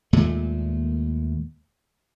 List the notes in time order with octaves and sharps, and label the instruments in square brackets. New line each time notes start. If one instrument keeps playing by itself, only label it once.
[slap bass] D#2 A#2 G#3 A3